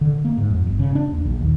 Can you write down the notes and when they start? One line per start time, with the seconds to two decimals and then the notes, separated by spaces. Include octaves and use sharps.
0.01 D3
0.25 A#3
0.37 G#2
0.50 F2
0.67 G1
0.79 C#3
0.95 D4
1.12 D#2
1.25 A#1
1.41 D#2